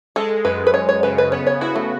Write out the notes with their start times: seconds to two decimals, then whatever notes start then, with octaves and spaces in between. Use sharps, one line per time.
0.16 G#3 A4
0.45 F#2 B4
0.67 B4
0.74 F#2 C#5
0.89 C#5
1.03 C#3 B4
1.18 B4
1.32 B3 C#5
1.47 C#5
1.61 E4 F#4
1.76 A3